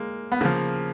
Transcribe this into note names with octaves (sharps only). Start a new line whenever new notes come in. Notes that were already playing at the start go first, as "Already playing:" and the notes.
Already playing: G#3 A#3
B3
C#3 F3 A#3